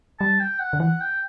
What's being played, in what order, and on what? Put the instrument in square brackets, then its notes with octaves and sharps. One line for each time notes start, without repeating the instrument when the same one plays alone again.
[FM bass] G3 [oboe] A5
[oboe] G5
F#5
[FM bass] D3
[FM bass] E3 [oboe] F#5
[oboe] G5